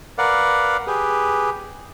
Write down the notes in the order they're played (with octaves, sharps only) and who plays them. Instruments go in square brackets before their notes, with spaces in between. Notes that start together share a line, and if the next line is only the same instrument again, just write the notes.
[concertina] A#4 B4 D5 F5 F#5
G4 G#4 B4